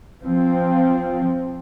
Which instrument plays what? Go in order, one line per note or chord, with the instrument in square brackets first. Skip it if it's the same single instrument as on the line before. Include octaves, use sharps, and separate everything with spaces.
[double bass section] F3 C4